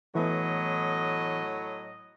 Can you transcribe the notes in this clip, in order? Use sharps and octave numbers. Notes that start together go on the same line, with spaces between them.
A2 E3 F#3 A3 B3 D#5